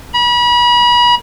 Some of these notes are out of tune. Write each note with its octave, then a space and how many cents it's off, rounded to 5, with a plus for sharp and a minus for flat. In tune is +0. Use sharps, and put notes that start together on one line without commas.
B5 -35